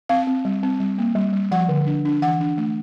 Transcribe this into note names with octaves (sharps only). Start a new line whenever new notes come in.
C4 F5
C4
G3
C4
G3
A#3
G3
G3
F3 F#5
D3
D4
D4
E3 F#5
D4
A3